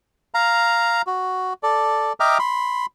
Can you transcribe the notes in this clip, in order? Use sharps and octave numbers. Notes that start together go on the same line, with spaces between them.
F5 A#5
F#4
A4 D5
D#5 E5 G5 A#5 D6 F6
B5 C6